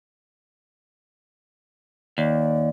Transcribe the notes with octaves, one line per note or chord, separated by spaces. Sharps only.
D#2 D5